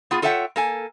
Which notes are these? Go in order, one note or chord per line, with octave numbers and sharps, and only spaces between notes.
B3 F4 G#4
F4 A4 C#5 E5 F#5 G5
A#3 A4 G#5